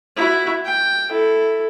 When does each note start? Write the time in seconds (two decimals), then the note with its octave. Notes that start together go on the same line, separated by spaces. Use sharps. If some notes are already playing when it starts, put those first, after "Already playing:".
0.17 E4 F#4
0.65 G5
1.10 E4 A4